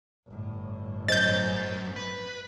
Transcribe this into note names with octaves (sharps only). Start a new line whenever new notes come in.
G1 A2
F#2 C5 D#5 G6 A6
B4